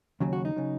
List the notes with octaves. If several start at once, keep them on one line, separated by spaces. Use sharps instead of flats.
D#2 C#3 F#3
F#4
D#4
C#3 F#3